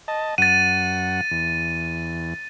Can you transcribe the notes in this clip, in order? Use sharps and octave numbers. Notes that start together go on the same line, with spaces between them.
D#5 A5
F#2 F#5 A6 D#7
E2